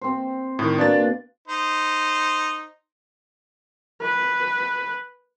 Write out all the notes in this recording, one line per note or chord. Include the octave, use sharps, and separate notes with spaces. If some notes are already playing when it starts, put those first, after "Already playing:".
C4 C5
A2 D#3
B2 A#3 D4 D5 A6
D#4 C5
B4